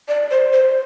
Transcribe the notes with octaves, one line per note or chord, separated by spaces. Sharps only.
D5
C5
C5